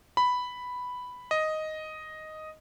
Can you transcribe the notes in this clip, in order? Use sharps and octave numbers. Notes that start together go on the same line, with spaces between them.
B5
D#5